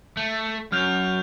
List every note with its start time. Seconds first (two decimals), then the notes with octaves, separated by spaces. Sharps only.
0.17 A3
0.72 F#2 F6 G6 F7